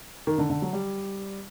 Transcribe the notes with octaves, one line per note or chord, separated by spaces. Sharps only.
D#3
D3
D3
F#3
G3